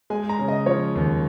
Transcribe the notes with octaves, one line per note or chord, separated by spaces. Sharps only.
G#3 G#5
A#5
C#3
D#5
F3 C#5
D#2